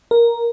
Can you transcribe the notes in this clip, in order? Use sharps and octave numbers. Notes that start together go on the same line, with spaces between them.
A#4